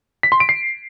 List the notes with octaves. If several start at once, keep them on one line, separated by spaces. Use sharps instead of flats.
B6
C6
D7
C7